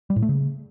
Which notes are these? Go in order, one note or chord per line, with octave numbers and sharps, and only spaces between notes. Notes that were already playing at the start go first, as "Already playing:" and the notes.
G3
A2
A3
C#3